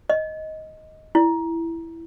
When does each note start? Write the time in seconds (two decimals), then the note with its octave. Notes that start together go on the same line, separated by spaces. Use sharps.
0.10 D#5
1.15 E4